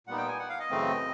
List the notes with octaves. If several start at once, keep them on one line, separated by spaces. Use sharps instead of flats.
A#2 G3 B3 D#4 F#5
G5
G#5
F#5
F5
D#5
F#2 C#3 E3 A3 C4